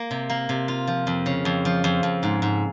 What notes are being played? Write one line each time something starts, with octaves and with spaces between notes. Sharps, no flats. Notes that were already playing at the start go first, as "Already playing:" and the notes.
Already playing: A#3
C3
A#3
C3
F4
F3
F2
C#3
F2
F3
F2
F2
G#2
G#2